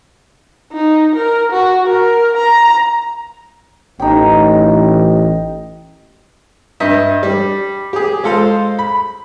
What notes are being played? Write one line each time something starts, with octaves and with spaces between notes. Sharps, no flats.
D#4
A#4
F#4
A#4
A#5
A1 D#4 G5
G2 D#5 E5
G3
G4 G#4
G#3 F4 A4 C5 F5
B5